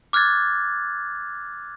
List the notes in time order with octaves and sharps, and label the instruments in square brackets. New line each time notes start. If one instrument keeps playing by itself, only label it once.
[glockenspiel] D6 F6 F#6 G#6 A6